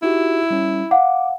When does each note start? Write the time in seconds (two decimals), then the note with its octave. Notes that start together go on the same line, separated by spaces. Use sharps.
0.03 D#4 E4 F#4 G4
0.50 G3 C#4
0.91 F5 F#5 D6